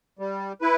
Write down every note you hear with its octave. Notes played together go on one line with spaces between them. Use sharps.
G3
E4 B4